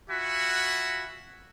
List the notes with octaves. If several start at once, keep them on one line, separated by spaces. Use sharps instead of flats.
F4 F#4 E5 F#5 G#5 B5